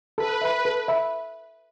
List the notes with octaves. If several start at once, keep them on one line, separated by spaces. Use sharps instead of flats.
A4 B4
E5 B5
A4
E5 B5